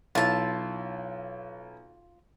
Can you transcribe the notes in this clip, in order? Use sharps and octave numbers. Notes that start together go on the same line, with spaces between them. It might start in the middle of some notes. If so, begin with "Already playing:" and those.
B1 E4 F4 E5 A5